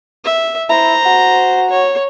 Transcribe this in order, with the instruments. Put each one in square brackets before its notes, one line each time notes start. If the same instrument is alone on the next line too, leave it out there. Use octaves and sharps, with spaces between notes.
[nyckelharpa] E5
[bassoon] E4 [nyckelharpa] C5 A#5
[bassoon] F#4
[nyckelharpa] C#5